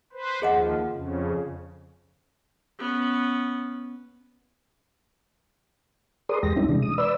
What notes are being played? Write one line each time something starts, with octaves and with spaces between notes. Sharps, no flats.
B4 C5
D#2 F3 G#4 D#5 F#5
F2 C#3
B3 C#4
G#4 A#4 B4 D5 C6 D#6
E2 G#3 G4 A#6
G3 C4 C#4 D#4 E4
C3 E3 G#3 D4
D#6
B4 D5 E6